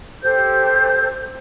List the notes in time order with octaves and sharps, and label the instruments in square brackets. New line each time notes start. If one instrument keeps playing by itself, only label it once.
[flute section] G4 A4 C5 G6